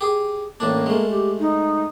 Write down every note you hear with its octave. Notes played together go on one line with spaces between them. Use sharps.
G4 G#4
A1 A2 A#3 D4
G#3 A3
G4
D#4